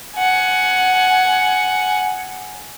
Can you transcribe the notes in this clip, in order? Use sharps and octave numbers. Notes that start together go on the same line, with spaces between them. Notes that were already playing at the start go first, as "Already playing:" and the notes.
F#5 G#5